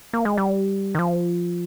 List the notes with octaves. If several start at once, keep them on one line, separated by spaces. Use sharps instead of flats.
A#3
G#3
G3
D#3
F3